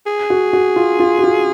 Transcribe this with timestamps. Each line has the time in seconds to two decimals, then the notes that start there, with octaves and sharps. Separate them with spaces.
0.06 G#4
0.30 F#4
0.53 F#4
0.76 F4
1.00 F4
1.18 F#4
1.23 F4